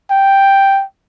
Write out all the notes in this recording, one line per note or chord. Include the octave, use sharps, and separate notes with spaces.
G5